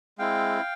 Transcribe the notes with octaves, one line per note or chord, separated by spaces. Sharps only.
G#3 C4 E4 F5 G5